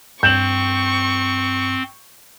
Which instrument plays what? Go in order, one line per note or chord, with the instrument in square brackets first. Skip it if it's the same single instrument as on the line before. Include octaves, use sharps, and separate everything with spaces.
[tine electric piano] G2 [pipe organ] C4 [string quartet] C#6 [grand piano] G6 E7 F#7